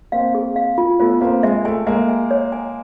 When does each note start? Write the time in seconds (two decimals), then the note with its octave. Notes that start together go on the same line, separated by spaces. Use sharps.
0.12 A#3 C4 F5
0.35 G#4
0.56 F5
0.78 F4
0.99 A3 B3 F4
1.21 A#3 C4 F5
1.43 G#3 E5
1.65 A3 G#5
1.86 G#3 A#3 E5
2.09 G#5
2.31 C#5
2.52 G#5